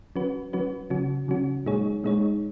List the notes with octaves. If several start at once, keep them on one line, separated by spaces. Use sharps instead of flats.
F#3 C#4 F#4 B4
F#3 C#4 F#4 B4
C#3 F#3 C#4 F#4
C#3 F#3 C#4 F#4
A#2 G#3 D#4 G#4 C#5
A#2 G#3 D#4 G#4 C#5